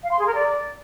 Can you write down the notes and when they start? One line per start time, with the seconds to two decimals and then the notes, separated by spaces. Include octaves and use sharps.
0.03 F5
0.11 C6
0.19 G#4
0.26 A#4
0.34 D5